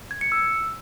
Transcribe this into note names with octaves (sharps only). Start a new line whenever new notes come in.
G#6
C#7
E6